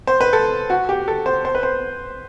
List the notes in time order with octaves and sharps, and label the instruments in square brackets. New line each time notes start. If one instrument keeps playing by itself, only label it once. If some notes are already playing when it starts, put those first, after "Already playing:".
[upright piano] C5
B4
A4
F#4
G4
A4
C5
C5
B4
C5